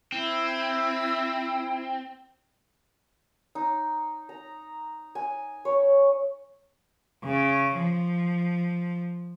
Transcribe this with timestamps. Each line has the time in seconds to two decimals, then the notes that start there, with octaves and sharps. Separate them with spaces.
0.12 C4 E4
3.55 D#4
4.29 A#5
5.15 G#5
5.65 C#5
7.24 C#3
7.77 F3